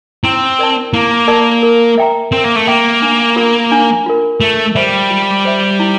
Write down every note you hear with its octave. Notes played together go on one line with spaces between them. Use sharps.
C4 E4
A#4 D5 A5
A#3 E4
A#4 D5 A5
A#4
E5 G5 A#5
C4 A#4
A#3
A3
A#3 E5 G5 A#5
D4
F4 A#4
D4
F4 A#4
A3 F4
G3 C5 E5
F4
C5 E5
E4